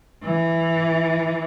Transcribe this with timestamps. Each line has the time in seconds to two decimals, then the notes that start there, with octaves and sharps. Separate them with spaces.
0.23 E3